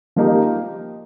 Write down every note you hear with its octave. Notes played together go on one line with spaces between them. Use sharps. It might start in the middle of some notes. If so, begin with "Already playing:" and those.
F3 A#3 D#4 G4